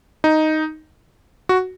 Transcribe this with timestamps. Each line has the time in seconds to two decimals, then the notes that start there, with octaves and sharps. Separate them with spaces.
0.24 D#4
1.49 F#4